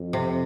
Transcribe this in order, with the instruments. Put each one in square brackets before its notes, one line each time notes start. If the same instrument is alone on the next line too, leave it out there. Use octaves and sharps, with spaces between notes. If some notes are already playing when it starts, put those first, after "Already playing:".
Already playing: [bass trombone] F2
[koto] C3